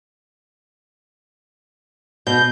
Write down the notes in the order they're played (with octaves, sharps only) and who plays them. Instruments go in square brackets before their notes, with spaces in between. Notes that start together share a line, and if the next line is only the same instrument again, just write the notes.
[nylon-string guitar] B2 [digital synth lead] G6